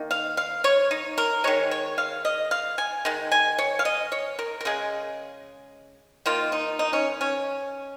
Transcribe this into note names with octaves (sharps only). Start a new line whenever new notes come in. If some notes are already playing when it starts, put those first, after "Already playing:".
Already playing: D#3 A#3
F5
F5
C#5
D#4
A#4
D#3 G#3 C#5
C#5
F5
D#5
F5
G#5
D#3 G#3
G#5
C#5
F5
D#5
C#5
A#4
A#4
C#3 G#3 G#4
D#3 A#3 F4
D#4
D#4
C#4
C#4